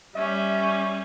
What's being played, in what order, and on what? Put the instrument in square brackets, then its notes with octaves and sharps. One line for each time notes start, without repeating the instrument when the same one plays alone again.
[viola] G3 C#4 [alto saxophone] E5